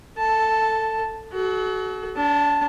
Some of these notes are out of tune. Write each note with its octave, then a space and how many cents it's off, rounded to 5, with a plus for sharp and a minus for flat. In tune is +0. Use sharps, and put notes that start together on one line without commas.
A4 +15 A5 +0
F#4 +20 A4 -40
D4 -35 A5 +0